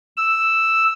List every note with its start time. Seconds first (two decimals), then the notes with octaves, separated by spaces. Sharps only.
0.17 E6